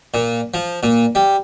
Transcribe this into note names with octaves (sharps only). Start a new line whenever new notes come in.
A#2
F3
A#2
G3